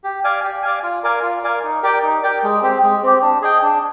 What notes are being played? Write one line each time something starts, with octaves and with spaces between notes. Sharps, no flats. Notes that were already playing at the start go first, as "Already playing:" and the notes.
G4
D5 F5 G#5
G4
D5 F5 G#5
F4
A#4 D5 F5 G#5
F4
A#4 D5 F5 G#5
D#4
G4 A#4 D5 G5
D#4
G4 A#4 D5 G5
G#3
C4 G4
G#3
C4 G4
D4
G#4 D#5 G5
D4